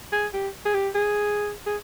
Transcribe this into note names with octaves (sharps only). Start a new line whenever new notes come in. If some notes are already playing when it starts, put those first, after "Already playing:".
G#4
G4
G#4
G4
G#4
G#4